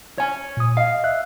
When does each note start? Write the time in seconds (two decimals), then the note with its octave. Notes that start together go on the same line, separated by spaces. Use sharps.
0.18 C#5 G#5
0.57 A#2 D#6
0.77 D#5 F5
1.04 E5 F#6